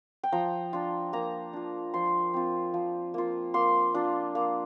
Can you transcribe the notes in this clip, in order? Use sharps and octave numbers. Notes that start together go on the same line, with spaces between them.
G5
F3 A#5
D4 F4
A#3 A#5
D4 F4
F3 C6
C4 F4
F3
A#3 F4
A#3 C6
D4 F4
A#3